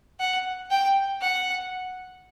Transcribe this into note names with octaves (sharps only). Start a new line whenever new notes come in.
F#5
G5
F#5